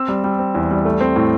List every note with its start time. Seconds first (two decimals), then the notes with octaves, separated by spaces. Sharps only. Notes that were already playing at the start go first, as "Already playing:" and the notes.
Already playing: C4 E6
0.08 G3
0.24 G3
0.39 C4
0.55 E2
0.71 G3
0.85 A3
1.00 C4
1.16 A2